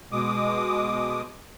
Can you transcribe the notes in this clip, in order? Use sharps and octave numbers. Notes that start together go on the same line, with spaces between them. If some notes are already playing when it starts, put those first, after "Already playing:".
B2 G#3 D6 D#6